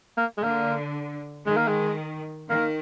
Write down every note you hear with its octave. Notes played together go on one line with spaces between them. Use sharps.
A#3
G#3
D3 A#3
D#3 G#3
A#3
G#3
D#3 A#3